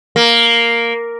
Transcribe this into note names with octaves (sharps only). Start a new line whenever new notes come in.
A#3